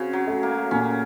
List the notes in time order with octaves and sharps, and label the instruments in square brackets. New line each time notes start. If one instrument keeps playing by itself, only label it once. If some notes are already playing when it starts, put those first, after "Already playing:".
Already playing: [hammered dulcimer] C#3 [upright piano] C4 F#4
[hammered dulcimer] F#3
[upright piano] A3
[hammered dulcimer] A#3
[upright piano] A#2 [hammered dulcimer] C#4